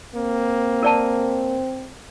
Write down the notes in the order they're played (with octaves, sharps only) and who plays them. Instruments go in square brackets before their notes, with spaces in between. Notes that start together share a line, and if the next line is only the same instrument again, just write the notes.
[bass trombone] A#3 [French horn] C4
[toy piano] A#4 D5 A5